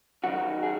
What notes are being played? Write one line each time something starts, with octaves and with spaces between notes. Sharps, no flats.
F#2 D#3 F#3 F#4
G#4